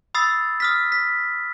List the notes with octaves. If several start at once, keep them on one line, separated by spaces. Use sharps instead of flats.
B5 D#6 E6 A6 C7
D#6 F6 B6
B6